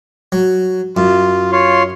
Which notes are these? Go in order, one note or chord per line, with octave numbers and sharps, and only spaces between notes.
F#3
F#2 F4
F4 C#5 C6